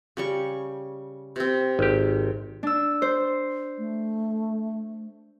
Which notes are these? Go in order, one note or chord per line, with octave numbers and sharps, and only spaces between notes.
C#3 G3 C#6
C3 C4
G#1 G4
D4 E6
C5
A3